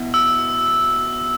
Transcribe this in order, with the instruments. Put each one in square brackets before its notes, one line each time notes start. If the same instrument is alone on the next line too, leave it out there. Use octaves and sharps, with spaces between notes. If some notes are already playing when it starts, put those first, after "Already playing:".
Already playing: [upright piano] B2 E4
[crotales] E6